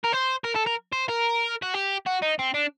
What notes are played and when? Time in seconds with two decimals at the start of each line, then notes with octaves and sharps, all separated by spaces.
0.04 A#4
0.12 C5
0.44 A#4
0.55 A4
0.66 A#4
0.93 C5
1.09 A#4
1.62 F#4
1.74 G4
2.06 F#4
2.22 D#4
2.39 C4
2.54 D4